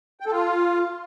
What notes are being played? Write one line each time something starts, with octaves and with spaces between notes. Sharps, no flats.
G5
A4
F4